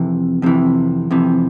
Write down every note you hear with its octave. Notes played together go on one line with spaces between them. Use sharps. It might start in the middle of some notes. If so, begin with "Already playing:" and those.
Already playing: F2 C3 E3
F2 C3 E3
F2 C3 E3